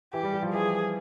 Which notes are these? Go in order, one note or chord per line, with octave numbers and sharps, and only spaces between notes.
E3 G4
G3
G3
F3
E3 G#4